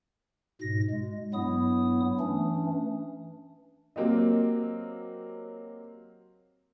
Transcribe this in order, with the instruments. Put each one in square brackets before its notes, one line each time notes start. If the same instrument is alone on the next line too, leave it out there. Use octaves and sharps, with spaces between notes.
[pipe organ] G#2 B2 A#6
G#3
G2 F#3 B3 E4 D#6
E3 A3 C#4 D4
[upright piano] F#3 A#3 C4 G4 D#5